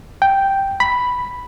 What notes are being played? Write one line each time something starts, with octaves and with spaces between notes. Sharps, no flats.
G5
B5